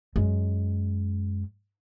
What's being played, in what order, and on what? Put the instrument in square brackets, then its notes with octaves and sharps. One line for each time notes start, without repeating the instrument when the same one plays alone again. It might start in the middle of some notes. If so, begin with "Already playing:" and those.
[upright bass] F#2 G#3